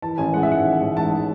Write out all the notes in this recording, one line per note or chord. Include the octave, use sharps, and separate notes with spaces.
E3 A5
A1 G#5
G#3 F#5
E5
G#2 F#5
A1
A1
G#2 A5
G#3